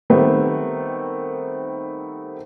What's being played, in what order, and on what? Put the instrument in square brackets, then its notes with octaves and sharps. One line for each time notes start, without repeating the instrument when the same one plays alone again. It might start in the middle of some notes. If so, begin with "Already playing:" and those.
[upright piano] D#3 G3 A3 B3 C4